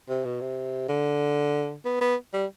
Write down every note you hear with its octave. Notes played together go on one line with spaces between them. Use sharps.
C3
B2
C3
D3
B3
B3
G3